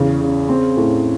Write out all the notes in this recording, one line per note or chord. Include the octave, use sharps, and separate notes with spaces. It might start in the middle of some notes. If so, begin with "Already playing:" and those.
Already playing: E2 C#3
C#3
C4
A2